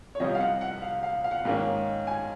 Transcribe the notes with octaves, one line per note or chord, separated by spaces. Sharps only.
C#5
C2 C3 F3 C4 D#5
F5
F#5
F#5
F5
F5
F5
F#5
F5
G#2 D#3 A#3 C#4
G#5